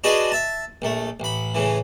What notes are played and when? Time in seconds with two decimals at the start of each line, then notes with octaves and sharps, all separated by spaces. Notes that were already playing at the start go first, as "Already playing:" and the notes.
0.04 D4 F#4 G#4 B4 D#5
0.32 E5 A5
0.82 A#1 A3
1.20 A1 B5
1.55 A2 C#3 E3